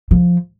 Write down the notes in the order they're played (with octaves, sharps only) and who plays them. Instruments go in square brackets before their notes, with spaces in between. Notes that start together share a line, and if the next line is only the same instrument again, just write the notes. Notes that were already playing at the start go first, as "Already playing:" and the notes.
[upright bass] F3